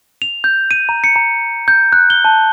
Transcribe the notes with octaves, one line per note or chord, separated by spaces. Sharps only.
F7
G6
D#7
A#5
C#7
A#5
G6
F#6
G7
A5